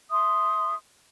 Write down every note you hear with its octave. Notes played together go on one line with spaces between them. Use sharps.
E5 C6 D#6